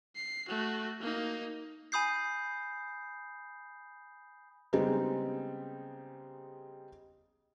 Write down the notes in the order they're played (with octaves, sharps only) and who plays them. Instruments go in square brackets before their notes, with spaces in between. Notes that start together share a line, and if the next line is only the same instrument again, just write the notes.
[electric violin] C7
A3 F#4
A#3 D#4
[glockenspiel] G#5 B5 D#6 G6 C7
[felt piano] C#3 G3 G#3 B3 C4 D#4